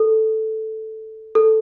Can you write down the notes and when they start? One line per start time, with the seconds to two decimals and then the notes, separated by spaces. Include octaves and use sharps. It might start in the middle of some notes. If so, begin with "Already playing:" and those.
Already playing: A4
1.35 A4